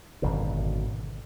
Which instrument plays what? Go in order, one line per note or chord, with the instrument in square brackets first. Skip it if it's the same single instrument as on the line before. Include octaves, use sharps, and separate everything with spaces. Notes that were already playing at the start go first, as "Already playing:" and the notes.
[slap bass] G#1 F#2 B2 D3